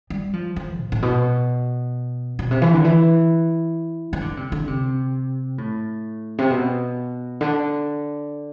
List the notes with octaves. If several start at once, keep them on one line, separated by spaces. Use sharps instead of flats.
G3
F3
F3
A2
A2
B2
B2
C3
E3
D3
E3
E3
D3
C3
D3
C3
A2
C3
B2
D3